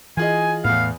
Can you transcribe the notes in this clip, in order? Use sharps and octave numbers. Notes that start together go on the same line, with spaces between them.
E3 F4 G#4 D#5 G#5
E2 A2 B3 F5